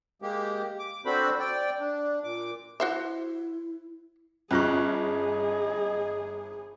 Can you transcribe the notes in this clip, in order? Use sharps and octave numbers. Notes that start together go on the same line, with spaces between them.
G#3 A#3 G4
D6
C4 D4 F#4 A4 C5 B5
D5 G5
D4
A#2 D6
E4 F#4 C5 E5
G1 C#4 F4 G#4 D#5 C#6 F6 F#6